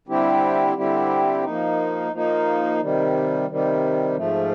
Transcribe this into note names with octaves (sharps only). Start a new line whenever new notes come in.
D3 G3 C4 E4 G4
D3 G3 C4 E4 G4
F3 A#3 D#4
F3 A#3 D#4
C3 D#3 G3
C3 D#3 G3
G#2 F3 A3